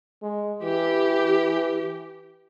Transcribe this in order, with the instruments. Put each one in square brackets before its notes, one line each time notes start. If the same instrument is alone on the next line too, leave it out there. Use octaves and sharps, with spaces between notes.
[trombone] G#3
[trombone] E3 [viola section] G4